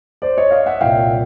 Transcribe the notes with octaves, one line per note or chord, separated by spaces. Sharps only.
C5 D5
C#5 D#5
D#5 F5
E5 F#5
C2 A#2 F5 G5